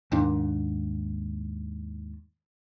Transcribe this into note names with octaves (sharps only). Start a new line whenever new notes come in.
D#2 G#2 D4